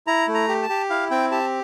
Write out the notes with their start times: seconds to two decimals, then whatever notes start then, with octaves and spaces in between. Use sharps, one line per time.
0.07 E4 A#5
0.28 A3
0.34 A#5
0.48 G4
0.63 A5
0.69 G4
0.90 E4 F5
1.11 C4 G5
1.31 G4 A5